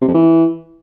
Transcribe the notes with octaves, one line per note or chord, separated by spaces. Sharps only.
C3
F2
E3